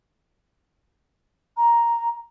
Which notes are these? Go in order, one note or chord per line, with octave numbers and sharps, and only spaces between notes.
A#5